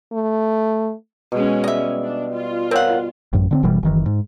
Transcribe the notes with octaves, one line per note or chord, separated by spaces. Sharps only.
A3
B2 G#3 C#4
G3 D#5 E5
D4
F4
C4 A#4 C#5 F5 F#5
A1 F#2
D3 B3 C4
F#1 B2 E3 G3
F#1 D#3 E3
G#2